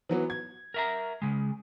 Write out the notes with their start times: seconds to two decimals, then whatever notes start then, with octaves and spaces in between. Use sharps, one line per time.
0.09 E3 F#3 B3
0.30 G#6
0.74 A#4 E5 A#5
1.22 C#3 G#3